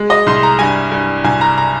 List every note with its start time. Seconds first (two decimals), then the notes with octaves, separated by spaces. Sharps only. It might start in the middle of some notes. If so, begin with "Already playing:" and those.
Already playing: G#3
0.10 D#5
0.26 C2 C6
0.43 A#5
0.59 G2 G#5
0.91 G2
1.24 C2 G#5
1.41 A#5
1.58 A#5